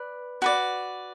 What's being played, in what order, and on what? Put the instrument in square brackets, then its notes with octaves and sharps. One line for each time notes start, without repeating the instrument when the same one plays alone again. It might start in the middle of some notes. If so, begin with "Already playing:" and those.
Already playing: [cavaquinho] B4 D5
F#4 B4 D5